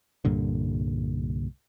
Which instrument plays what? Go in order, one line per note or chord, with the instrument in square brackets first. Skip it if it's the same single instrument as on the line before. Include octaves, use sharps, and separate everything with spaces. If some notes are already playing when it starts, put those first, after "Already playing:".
[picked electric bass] C2 G2 A#2 D3